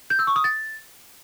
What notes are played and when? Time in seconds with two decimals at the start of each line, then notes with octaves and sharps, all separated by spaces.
0.10 G6
0.19 E6
0.27 C#6
0.36 D#6
0.44 A6